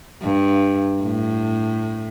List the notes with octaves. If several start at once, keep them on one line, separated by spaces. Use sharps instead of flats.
G2
A2